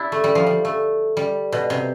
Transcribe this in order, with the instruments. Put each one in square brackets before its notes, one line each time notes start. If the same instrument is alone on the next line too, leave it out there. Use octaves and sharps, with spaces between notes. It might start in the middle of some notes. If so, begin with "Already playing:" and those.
Already playing: [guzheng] D4 E4 G4
A3
G3
F3
G3
A3
G3
B2
C3